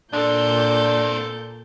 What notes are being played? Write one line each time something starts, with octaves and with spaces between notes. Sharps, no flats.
A#2 B3 C4 D4 A4 G6